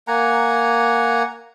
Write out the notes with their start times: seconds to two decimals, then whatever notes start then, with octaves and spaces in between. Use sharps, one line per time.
0.08 A#3 F#5 G#5 A#5